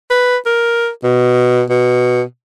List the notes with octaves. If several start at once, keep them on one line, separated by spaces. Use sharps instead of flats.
B4
A#4
B2
B2